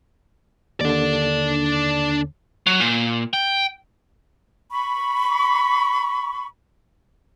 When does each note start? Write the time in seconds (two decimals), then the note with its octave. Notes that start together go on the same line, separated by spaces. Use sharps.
0.81 D#2 D3 D4 D5
2.67 F#3
2.80 A#2
3.33 G5
4.71 B5 C#6